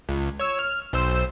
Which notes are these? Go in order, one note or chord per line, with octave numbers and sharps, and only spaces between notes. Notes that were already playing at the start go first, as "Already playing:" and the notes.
C#2
C#5 E6
F6
B1 C5 E6